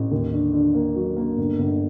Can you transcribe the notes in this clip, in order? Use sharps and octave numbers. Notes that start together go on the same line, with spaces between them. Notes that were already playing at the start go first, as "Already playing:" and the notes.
Already playing: A1
D#2
D3
D3
A#3
F#3
A#3
G1
G1